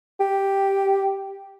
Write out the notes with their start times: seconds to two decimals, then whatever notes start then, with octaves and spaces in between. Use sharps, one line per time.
0.20 G4